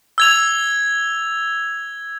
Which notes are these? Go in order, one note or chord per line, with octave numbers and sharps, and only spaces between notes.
E6 G#6 F7